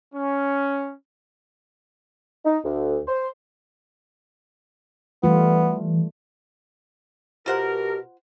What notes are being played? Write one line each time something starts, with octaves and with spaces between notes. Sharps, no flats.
C#4
D#4
D2
C5
E3 G3 A3 B3 F4
B2 F4 G4 A#4 C5 F#5